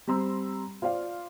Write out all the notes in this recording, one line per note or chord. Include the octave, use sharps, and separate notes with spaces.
G3 C4 A#5 C6 E6
F4 C5 D5 F5